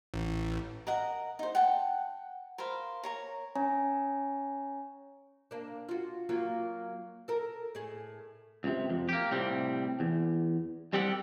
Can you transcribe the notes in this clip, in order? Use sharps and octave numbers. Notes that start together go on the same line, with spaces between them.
A1
A#4 D#5 F#5 A#5
D#4 C5
F#5 G5 A5
A#4 C5 F5 B5
A#4 C#5 A#5
C#4 C#5 G#5 A#5
A#3 D4
F4 F#4
F#3 A#3 F4
A4 A#4
A2 G#4
C#2 C3
F2
A#3 G4
A2 C3 G3 C4
E2
C2 G3 C4 G4 A4 F#5